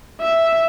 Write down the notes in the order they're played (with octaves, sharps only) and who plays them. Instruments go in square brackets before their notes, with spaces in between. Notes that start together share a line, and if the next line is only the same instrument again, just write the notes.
[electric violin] E5